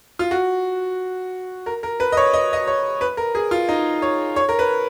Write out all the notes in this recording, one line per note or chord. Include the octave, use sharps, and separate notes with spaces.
F4
F#4
A#4
A#4
B4
D#5
C#5
D#5
D#5
C#5
B4
A#4
G#4
F4
D#4
C#5
C#5
A#4
B4